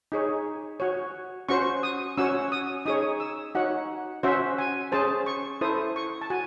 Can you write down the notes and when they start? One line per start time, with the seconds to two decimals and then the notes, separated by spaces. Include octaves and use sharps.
0.12 D#4 G#4 C#5
0.80 F#4 C#5
1.49 C#4 F#4 C5 C#6
1.83 D#6
2.17 C#4 F#4 C#5 E6
2.52 D#6
2.86 D#4 G#4 C#5 D#6
3.20 E6
3.55 D#4 F#4 C#5 F#5
4.23 C#4 F#4 C5 E5
4.58 G#5
4.92 C#4 G#4 C5 A5
5.26 C#6
5.61 E4 A4 C5 D#6
5.96 C#6
6.21 A5
6.30 F#4 G#5